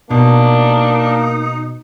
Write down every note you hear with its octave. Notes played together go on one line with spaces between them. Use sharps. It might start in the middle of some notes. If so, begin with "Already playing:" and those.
B2 A#3 D4 D#4